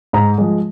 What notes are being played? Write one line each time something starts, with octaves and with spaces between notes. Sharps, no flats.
G#2 A#5
F3 G#3